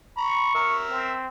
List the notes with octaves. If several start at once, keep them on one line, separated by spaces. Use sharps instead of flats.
A#5 B5 C#6
A#4 E5
C4